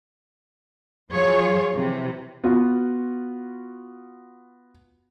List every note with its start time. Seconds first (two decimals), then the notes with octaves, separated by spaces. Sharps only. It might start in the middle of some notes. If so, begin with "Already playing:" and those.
1.11 F3 F#3 F4 G#4 C#5
1.76 C3 E3
2.44 B3 F4 F#4